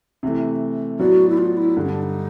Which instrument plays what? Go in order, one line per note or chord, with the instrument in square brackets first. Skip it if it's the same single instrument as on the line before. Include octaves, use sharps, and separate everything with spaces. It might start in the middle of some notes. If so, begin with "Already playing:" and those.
[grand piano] C3 E3 A3
[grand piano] A2 F#3 B3 D4 [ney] F#4
[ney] E4
F4
E4
[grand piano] G2 D3 G3
[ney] C#4
D4
D#4